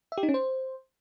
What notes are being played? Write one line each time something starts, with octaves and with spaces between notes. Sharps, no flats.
E5
G4
D#4
C#4
C5